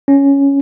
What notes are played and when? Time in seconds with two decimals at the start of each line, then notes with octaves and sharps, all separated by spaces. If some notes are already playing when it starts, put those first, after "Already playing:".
0.08 C#4